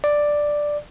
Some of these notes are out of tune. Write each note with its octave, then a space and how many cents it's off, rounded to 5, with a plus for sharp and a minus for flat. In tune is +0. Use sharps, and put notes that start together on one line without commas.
D5 +5